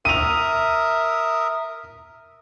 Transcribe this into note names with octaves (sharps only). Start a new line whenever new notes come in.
A#4 E5 D#6 D#7 F7